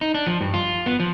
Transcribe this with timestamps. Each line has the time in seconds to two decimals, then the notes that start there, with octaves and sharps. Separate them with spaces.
0.01 D#4
0.14 D4
0.27 F3
0.41 G2
0.54 F4
0.86 B3
1.00 F3